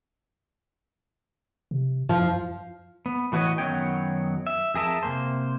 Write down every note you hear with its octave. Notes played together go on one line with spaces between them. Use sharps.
C3
F#2 F3
B3
A2 E3 F#4 B4 C#5 D#5
F#2 D#3 F#3 B3 C#5 G5
E5
F2 G#4 A#4 E5 A5
C3 A#3 C5